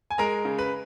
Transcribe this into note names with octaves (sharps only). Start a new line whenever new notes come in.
G#5
G#3 A#4 A#5
C#3
B4 B5